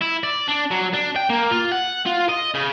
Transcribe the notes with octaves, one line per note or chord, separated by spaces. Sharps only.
E4
D5
D4
F#3
D4
G5
A#3
F4
F#5
F4
D#5
C#3